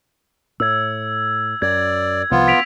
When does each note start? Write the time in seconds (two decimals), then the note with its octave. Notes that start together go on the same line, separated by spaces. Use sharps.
0.60 A2 E6 G#6
1.62 F#2 D5 G#6
2.31 C2 F3 B3 F4
2.48 B6 D7 F7